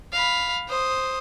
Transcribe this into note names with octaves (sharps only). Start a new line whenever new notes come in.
F5 B5
C5 D#6